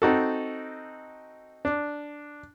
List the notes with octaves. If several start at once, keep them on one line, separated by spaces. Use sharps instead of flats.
C4 D#4 F#4 A4
D4